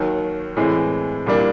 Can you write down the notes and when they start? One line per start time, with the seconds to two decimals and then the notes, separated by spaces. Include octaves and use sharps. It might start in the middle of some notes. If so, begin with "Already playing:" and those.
Already playing: D#2 D#3 F#3
0.57 A2 E3 G#3 C4
1.26 C2 A#2 G3 A#3 D4